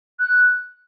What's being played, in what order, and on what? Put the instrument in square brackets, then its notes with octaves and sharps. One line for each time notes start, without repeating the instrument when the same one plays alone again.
[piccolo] F#6